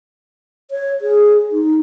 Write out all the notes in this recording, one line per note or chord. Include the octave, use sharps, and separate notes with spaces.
C#5
G#4
D#4